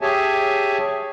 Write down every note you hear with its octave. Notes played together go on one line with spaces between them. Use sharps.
G4 G#4 C#5 E5 G#5 A5